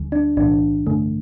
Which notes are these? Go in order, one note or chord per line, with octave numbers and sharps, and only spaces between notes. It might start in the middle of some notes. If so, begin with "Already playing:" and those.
Already playing: D2 D3 G3
D4
B1 A2 E3 D4
G2 D3 A3